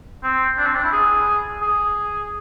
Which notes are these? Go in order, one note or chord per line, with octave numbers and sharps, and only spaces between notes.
C4
D4
C4
D4
E4
G#4
G#4